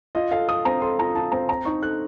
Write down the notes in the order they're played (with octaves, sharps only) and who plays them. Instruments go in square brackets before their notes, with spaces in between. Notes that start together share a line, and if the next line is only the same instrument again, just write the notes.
[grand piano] F4 [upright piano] D#5
[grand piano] A4 [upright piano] F5
[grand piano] A4 [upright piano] D#6
[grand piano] C4 [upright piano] A#5
[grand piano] A4 [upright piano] C6
[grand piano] F4 [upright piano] A#5
[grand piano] F4 [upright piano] A5
[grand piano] C4 [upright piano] A#5
[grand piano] C5 [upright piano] A#5
[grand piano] D#4 [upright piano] C#6
[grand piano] A4 [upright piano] F#6